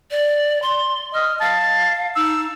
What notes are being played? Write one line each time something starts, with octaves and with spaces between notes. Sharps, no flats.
D5
C6
D#5 F6
F5 A5
D#4 E6